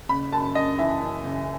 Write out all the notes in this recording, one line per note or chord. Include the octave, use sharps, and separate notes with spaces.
F#1 B5
F#2 A5
F#2 D#5
E3 E5
F#2
F#1